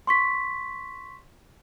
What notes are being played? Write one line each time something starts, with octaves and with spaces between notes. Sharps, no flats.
C6 C#6 B6